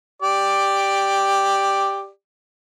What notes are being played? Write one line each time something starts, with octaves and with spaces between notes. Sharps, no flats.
G4 D5